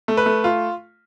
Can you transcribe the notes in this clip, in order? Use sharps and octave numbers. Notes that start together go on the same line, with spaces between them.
A3
B4
A3
F4